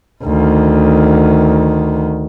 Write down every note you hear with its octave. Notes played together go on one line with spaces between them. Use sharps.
D2 D#3